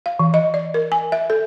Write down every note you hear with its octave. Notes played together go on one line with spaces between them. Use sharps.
F5
E3
D#5
D5
A#4
G#5
E5
A4